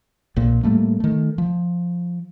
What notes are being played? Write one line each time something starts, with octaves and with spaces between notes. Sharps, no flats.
A#1 A#2
A2 G3 A3 A#3
D#3 A3
F3